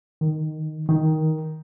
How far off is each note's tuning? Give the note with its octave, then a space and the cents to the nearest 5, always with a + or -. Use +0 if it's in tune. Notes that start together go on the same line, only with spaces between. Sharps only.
D#3 -5
D#3 +10